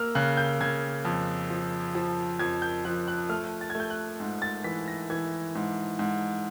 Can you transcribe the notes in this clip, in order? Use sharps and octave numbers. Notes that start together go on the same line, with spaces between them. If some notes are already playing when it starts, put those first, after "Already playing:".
Already playing: A#3 E6 F6
C#3 F#6
G6
C#3 G#6
F2
F3
F3
F2 G#6
G6
F3 F#6
F#6
A3 F6
A6
G#6
A3
G6
F#6
G#2
A6
E3 B6
A#6
E3 G#6
G#2
G#2